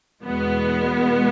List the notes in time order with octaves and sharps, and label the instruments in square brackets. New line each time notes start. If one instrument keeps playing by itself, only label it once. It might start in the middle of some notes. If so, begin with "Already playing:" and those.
[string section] E2 B2 G#3 B3